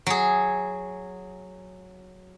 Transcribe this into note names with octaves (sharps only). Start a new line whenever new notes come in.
F#3 G#4